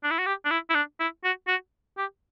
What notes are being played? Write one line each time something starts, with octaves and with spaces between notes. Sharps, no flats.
D4
E4
F#4
G4
D4
E4
E4
D4
E4
F#4
F#4
G4